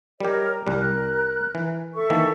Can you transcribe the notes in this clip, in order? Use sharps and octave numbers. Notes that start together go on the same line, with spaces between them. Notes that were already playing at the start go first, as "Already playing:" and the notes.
G3 G4 A#4 C#5 D#5
C2 G3 A#4 F#6
E3
A4 E5 C#6
D#3 E3 A#3